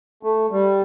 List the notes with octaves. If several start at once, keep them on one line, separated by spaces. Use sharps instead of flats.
A3
G3